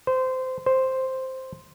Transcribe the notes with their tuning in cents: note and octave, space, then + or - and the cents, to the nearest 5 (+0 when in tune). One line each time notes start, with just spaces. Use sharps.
C5 -20
C5 +0